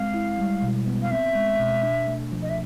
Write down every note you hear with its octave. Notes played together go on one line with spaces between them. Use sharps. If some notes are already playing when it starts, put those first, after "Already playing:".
Already playing: G#3 C4 F5
E4
G3
B2
B3
F5
C4 E5
G#3
B2
D4
A3
F3
D#5
E5